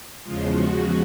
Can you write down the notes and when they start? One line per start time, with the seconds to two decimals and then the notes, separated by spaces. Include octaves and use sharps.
0.24 E2 C#3 F3 G#3 F4
0.52 F#4